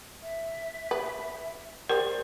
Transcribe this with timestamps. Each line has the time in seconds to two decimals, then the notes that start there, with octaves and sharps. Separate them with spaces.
0.23 E5
0.91 B4
1.89 G4 A#4 C5 D5